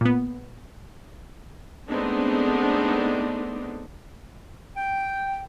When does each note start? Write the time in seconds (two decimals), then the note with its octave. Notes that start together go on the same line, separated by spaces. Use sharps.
0.01 A#2 B3
1.90 G#3 A3 B3 C4 D4 D#4
4.76 G5